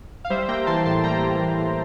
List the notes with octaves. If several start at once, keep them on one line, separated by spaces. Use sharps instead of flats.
F5
G3 C5 E5
A#3 G5 A#5
E3 A5 C6
A2 A5 C6
G3 G5 A#5
A#3
E3
A2